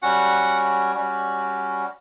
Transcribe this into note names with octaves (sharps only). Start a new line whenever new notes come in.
G3 C#4 F#4 F#5
G3 C#4 F#4